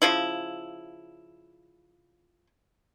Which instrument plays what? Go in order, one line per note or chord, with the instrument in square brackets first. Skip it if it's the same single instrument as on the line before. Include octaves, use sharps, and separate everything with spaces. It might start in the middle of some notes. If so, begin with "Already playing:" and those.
[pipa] C#3 F3 E4